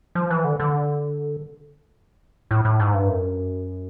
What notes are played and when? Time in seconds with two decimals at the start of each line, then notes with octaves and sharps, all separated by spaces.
0.15 F3
0.30 E3
0.44 D3
0.60 D3
2.51 A2
2.65 A2
2.80 G#2
2.94 G2
3.08 F#2